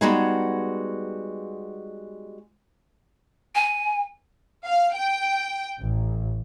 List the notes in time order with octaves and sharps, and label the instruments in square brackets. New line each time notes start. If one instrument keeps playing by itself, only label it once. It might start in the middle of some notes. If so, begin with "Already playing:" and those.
[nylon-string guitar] G3 G#3 B3 D#4 F#4 G#4
[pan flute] G#5
[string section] F5
G5
A1